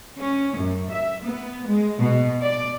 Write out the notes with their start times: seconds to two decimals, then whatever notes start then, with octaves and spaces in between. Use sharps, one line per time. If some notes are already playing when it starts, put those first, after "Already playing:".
0.20 C#4
0.58 F#2
0.91 E5
1.25 B3
1.68 G#3
1.99 B2
2.42 D5